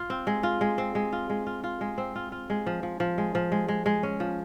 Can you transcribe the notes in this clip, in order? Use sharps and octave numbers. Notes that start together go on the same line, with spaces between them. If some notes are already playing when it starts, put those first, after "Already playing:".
Already playing: F4
C4
G#3
F4
G#3
C4
G#3
F4
G#3
F4
F4
G#3
C4
F4
F4
G#3
F3
F3
F3
G#3
F3
G#3
G#3
G#3
C#4
F3